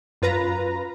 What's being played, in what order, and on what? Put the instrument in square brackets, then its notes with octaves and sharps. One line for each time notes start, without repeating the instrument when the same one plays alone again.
[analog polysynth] F#2 F4 B4 A#5 A#6